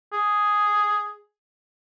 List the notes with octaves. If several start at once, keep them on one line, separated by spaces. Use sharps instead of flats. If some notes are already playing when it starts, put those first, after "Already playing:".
G#4